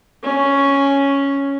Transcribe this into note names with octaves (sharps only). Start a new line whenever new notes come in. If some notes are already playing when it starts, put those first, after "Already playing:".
C#4